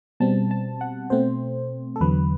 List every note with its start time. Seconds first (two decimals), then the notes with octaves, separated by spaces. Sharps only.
0.20 B2 G3 C4 A5
0.51 A5
0.81 F#5
1.10 B2 A3 C4 C5
1.96 A4
2.01 E2 D3 F#3 B4